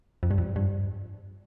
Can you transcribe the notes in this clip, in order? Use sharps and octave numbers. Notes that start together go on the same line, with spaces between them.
F2
G2
F2
G2